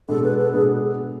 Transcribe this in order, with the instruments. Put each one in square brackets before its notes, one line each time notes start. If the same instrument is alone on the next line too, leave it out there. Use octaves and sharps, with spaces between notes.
[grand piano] B2 G#3 B3 D4 [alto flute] A4
[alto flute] B4
A4
[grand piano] B2 G#3 B3 D4 [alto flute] G#4